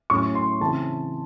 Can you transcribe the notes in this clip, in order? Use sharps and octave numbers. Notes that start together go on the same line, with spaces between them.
A2 F#3 C#4 C#6
C6
C#3 E3 C4 A5